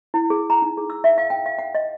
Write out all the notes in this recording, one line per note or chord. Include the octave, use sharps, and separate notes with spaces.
E4
G#4
A#5
D#4
G#4
E6
E5
F5
G5
F5
F#5
D#5